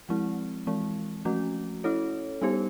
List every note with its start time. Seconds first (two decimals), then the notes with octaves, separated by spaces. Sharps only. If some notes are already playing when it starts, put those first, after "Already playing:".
0.09 F3 G#3 C4 E4
0.67 E3 G#3 C4
1.25 F3 A3 C#4 F#4
1.84 C#4 E4 A4 C#5
2.41 G3 B3 D#4 G4 C5